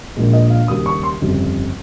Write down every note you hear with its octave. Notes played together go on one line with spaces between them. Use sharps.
A#1 A#2 G#3
D#5
F5
D#2 C#3 G3 D#6
C#6
C6
G1 F2 C#3 G3